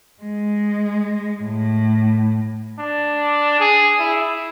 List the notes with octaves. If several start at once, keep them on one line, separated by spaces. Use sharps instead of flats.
G#3
A2
D4
G#4
E4